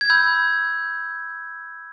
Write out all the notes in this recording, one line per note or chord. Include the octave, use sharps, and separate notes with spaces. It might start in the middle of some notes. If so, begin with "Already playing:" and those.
G#6
B5 E6 G6